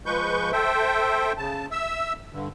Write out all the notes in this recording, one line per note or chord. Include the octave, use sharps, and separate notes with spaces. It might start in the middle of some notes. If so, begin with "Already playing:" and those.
F3 G#3 B4 C#6 G6
A4 C5 E5 G5
C#3 A5
E5 E6
G2 D3